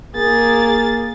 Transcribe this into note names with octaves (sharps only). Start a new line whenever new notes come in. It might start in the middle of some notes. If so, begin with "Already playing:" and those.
A#3 G#4 A6